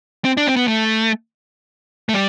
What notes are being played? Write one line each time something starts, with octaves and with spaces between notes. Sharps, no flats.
C4
D4
C4
B3
A3
A3
G3